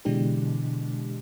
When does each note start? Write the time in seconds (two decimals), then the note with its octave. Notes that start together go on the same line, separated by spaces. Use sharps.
0.05 B2 D3 E3 G#3 D4 G4